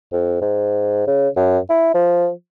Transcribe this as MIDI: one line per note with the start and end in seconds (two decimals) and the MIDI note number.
0.12 0.37 41
0.41 1.07 44
1.07 1.29 49
1.36 1.58 42
1.70 1.93 64
1.94 2.30 53